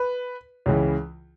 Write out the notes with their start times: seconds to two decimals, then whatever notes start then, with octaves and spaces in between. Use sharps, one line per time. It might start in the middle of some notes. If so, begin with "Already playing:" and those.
Already playing: B4
0.66 C#2 C#3 E3